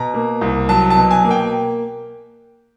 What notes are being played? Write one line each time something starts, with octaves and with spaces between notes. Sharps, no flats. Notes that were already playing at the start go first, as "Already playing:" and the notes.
Already playing: B2 A#5
A#3
C2
F#3 A5
A5
B2
G#5
A#3
G5